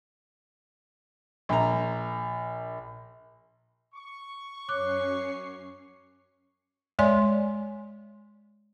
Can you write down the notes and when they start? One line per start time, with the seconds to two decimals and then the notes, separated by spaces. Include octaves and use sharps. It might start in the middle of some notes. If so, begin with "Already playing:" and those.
1.49 A#1 A#5
3.94 C#6
4.69 F#2 C#4 C#5 D6 F#6 C7
6.99 G#3 C#5 D5 G#5 C6